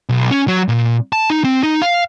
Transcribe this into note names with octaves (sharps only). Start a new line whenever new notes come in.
B1
C#4
F#3
A#2
A5
D#4
C4
D#4
F5